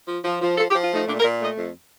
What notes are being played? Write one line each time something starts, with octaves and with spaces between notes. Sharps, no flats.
F3
F3
F3
F3 A4
G4
F3
F4
A3
D#4
A#2 D4
A#4
A#2
A3 D#5
F2